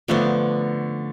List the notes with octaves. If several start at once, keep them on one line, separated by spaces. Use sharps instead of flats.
D3 F3 A3 B3 D4